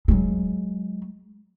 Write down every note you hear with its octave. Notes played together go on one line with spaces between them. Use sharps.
F#3 G#3